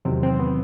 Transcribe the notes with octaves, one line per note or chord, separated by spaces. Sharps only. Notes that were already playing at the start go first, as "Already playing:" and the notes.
E2 C3 D#3 F#3 C4
C4
B3